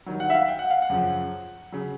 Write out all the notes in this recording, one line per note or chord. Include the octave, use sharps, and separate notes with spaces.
G2 D#3 F#3
F#5
E5
F5
G5
F#5
F5
F#5
F#2 C#3 F3
C#3 F#3